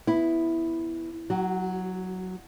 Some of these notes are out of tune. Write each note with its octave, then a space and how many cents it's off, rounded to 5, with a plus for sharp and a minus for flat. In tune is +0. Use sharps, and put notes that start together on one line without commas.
B3 +5 E4 +0
F#3 +0 F#4 +40